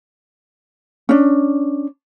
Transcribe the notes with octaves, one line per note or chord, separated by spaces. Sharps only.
C#4 D4